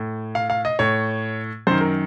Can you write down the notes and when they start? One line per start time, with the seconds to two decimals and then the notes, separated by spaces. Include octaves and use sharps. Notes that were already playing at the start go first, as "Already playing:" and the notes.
Already playing: A2
0.35 F5
0.50 F5
0.65 D#5
0.79 A2 C#5
1.67 F#2 D#3 C5
1.81 A#4